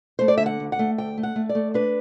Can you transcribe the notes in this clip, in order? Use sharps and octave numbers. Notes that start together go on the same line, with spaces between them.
A3 C5
D5
D3 E5
F#5
D2
F#5
A3
D2 G5
A3
F#5
A3
D5
A3
D4 B4